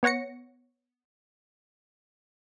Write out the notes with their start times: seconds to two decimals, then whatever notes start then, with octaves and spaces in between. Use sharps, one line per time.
0.03 B3 C#5 F#5 A#6 C#7